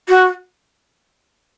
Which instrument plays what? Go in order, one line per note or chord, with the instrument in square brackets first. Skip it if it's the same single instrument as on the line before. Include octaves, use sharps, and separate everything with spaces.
[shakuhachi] F#4